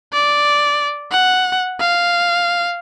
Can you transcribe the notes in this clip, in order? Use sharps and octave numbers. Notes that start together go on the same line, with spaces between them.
D5
F#5
F5